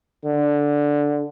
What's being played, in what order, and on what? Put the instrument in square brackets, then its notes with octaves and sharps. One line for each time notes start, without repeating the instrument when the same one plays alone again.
[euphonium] D3